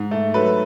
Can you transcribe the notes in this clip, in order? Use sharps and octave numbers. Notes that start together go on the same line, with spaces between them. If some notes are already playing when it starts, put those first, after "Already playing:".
Already playing: G#2
A3
F#3 A4 B4